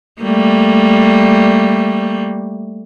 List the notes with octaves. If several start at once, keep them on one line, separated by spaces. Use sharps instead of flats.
G3 A3 A#3